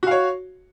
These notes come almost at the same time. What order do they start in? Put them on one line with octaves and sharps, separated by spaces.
F#4 F5 C#5